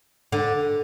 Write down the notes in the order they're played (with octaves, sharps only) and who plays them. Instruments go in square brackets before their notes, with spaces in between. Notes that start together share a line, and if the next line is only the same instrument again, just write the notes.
[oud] D3